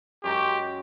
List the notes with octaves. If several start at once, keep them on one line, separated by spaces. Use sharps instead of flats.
F#2 G#3 G4 A#5